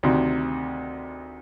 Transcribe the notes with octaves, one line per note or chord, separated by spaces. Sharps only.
D2 C3 D#3